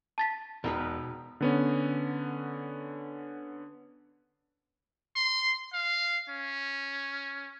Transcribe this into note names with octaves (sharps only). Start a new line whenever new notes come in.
A5 A6 B6
E1 B2 D#4 A#4 B4
D3 B3 C#4
C6
F5
C#4